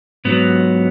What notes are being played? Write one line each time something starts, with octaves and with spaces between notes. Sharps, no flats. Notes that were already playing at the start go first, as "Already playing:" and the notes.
G#2 F#3 B3